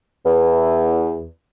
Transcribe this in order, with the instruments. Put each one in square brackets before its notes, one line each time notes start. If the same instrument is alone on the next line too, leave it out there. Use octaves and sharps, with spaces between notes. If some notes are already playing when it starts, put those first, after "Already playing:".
[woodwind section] E2